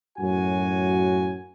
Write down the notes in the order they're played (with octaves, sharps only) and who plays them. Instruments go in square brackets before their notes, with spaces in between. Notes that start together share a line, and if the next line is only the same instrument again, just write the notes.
[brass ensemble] F#2 A2 F#4 G#5